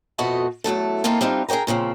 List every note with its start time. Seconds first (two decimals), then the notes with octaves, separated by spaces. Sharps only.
0.18 F2 B2 A3 F#4 D#5 A5
0.64 E2 F#3 A3 A4
1.04 A#3 C4 D#4 F4 A4
1.21 G3 C4 D4 D#4 F4
1.49 G#4 A#4 C#5 G5 A#5
1.67 A#2 C#3 F3 C4